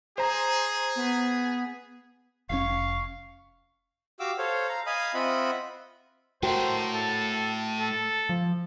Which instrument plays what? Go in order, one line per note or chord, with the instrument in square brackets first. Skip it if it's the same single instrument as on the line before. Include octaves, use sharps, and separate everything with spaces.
[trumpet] G#4 [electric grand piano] C5 A#5
[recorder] B3
[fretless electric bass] F1 C3 C#4 [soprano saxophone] F5 [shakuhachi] C#6
[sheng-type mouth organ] F#4 G4 F5 D6 E6
A4 C5 C#5 F5
F5 A#5
D#5 F5 G#5 B5 D#6
C4 F4 D#5 E5 F#5 B5
[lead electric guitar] A2 A3 [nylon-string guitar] F#4 A#4 G5 [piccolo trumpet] C5
[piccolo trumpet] A4
A4
[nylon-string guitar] F3